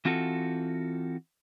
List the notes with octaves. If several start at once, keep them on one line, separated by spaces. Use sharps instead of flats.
E3 C4 F4 F#4 A4